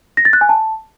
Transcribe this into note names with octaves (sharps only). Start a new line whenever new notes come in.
A#6
A6
F#6
G#5
A5